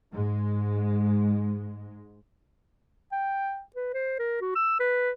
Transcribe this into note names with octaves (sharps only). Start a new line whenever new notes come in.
G#2 G#3
G5
B4
C5
A#4
F#4
E6
B4